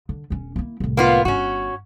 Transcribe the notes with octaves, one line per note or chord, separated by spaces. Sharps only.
D3
E1 C#4
A#3 E4
C2 A2
A#3 B3 F4
G1 C#4 F#4